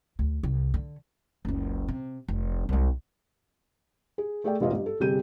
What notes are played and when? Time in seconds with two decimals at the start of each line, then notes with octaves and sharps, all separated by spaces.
0.19 D2
0.43 C2
0.74 D3
1.45 F#1 C#2
1.88 C3
2.28 F1
2.69 C2 G#3
4.18 G#4
4.44 A3 G#4 A4 D5 G5
4.61 E1 A1 G#2 F4 B4 D#5
4.73 G2
4.86 A4
5.00 G1 C3 G4 G#4 G6 D#7